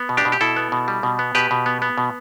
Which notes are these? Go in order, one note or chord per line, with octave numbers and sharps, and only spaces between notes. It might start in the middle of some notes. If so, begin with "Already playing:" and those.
Already playing: B3
B2
D4 G4
B2
G4
B2 E4 A4
B3
B2
G3
B2
B3
B2 G4 B4
B2
B3
B3
B2